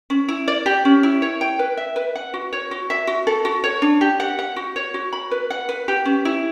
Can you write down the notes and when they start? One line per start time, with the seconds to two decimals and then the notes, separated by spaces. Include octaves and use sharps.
0.10 C#4
0.28 E4
0.48 D5
0.66 G4
0.85 C#4
1.03 E4
1.22 C#5
1.41 G5
1.59 B4
1.77 E5
1.96 B4
2.15 F#5
2.34 F#4
2.53 C#5
2.71 F#4
2.90 E5
3.07 F#4
3.27 A4
3.45 F#4
3.64 C#5
3.82 D4
4.01 G4
4.20 F#5
4.39 F#5
4.56 F#4
4.76 C#5
4.94 F#4
5.13 B5
5.31 B4
5.50 F#5
5.69 B4
5.88 G4
6.05 C#4
6.25 E4